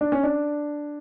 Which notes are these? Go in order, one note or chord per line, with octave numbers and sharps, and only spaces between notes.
D4
C#4
D4